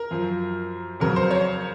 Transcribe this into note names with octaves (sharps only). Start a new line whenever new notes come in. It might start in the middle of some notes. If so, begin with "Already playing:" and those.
Already playing: A#4
F#2 F3
F2 C#3 F#3 A#4
C5
C#5